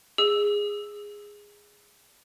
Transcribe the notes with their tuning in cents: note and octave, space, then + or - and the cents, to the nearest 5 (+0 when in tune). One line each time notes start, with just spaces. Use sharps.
G#4 -10 E6 +0